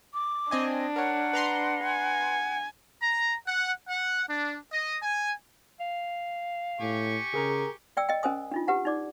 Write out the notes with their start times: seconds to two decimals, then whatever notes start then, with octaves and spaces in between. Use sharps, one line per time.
0.14 D6
0.51 C4 D4 D#5 G#5
0.96 A#4 C#5 F#5
1.33 B4 A#5 C6
1.85 G#5
3.02 A#5
3.48 F#5
3.88 F#5
4.29 D4
4.72 D#5
5.03 G#5
5.80 F5
6.80 A2 G4 G#5 C#6
7.34 C#3 G#4 A#4 A#5
7.97 D5 G5 E6
8.09 D#5 G5
8.23 C#4 A#4 C5 G#5 D#6
8.51 D4 D#4 F4
8.68 G4 B4 F#5 A5
8.85 D#4 D5 D6